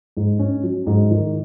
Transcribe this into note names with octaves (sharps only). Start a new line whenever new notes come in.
G#2
C#4
F#3
G#2
D#3